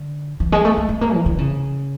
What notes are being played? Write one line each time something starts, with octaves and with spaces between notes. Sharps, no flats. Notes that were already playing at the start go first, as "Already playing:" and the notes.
Already playing: D3
E3
G#3
A3
A3
A3
A#3
E3
D3
C#3